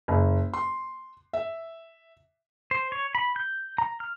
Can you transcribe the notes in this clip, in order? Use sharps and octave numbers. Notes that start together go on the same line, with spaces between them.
F#1
C6
E5
C5
C#5
B5
G6
A#5
F6